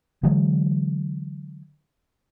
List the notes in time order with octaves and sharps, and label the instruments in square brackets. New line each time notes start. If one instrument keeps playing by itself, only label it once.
[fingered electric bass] D3 E3 F#3 G#3